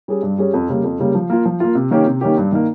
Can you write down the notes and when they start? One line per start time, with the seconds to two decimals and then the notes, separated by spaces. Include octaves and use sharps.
0.08 G3 C#4 G#4
0.23 G2
0.38 G3 C#4 G#4
0.54 F2
0.69 C#3 G3 A#3
0.84 F2
0.99 C#3 G3 A#3
1.15 F3
1.30 A#3 F4
1.45 F3
1.60 A#3 F4
1.75 C3
1.91 D#3 A#3 C#4 G4
2.06 C3
2.21 D#3 A#3 C#4 G4
2.37 G2
2.52 D#3 A#3